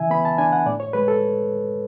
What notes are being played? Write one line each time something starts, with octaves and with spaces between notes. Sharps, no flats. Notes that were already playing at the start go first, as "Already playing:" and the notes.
Already playing: C#3 E3 E5 G#5
B3 B5
A5
D4 G#5
F#5
A2 D5
C#5
G#3 B4
A4